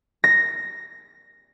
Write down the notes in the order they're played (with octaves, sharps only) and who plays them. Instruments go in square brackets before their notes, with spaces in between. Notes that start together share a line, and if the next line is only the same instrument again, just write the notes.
[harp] A#6